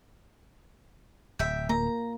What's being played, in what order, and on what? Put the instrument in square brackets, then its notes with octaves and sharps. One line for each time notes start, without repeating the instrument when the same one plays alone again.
[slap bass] D1 [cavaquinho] E5 G5
[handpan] A#3 [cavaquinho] A#5